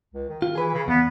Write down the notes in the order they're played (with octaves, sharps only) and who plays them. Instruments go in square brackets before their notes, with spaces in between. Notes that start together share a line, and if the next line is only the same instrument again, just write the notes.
[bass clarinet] C#2
D#3
[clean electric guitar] F4
[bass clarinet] E3 [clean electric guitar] G#4 B4
[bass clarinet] C#3
[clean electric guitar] E2 [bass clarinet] B3